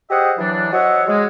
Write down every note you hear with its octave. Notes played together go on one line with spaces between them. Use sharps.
G4 G#4 C5 D#5 E5 F#5
E3 F#3 D4
F#4 C5 C#5 D#5 E5 F#5
G#3